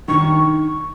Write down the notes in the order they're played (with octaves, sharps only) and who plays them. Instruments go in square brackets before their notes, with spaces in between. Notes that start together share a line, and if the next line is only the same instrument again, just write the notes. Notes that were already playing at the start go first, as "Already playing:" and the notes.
[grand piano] D#3 [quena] C#6